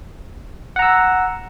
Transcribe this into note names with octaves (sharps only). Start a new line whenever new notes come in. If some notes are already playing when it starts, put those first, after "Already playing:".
F#5 A#5 E6